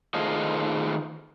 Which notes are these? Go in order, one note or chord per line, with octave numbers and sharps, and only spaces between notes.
D#3 A3 F4 G#4 C5 D#5